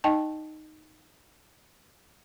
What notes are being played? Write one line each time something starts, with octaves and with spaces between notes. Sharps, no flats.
D#4 D#5 G5 A5